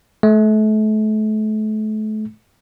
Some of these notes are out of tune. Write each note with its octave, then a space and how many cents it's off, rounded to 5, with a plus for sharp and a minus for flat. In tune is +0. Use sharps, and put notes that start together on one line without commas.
A3 -35